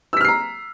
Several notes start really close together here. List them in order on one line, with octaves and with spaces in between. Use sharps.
E6 B6 F6 C7 A#5